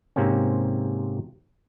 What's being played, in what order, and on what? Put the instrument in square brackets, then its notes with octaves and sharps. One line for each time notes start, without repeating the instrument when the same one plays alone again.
[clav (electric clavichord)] G#2 C3 A#3 C4 C#4